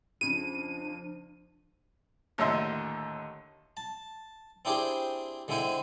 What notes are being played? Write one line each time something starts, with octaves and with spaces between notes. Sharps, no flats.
F2 C#3 F3 D4 D#7
D#2 A2 D3 D#5 E5 C6
A5
C4 D4 E4 G4 G#4 C5
D3 G#3 C4 E4 C5 G#5